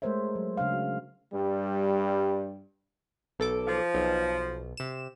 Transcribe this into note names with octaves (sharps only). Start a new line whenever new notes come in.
G#3 A3 A#4 C5 C#5 E5
F#3
C#3 D4 F5
F#4
G2 G3
B1 A4 D6
F3
B1
C3 E7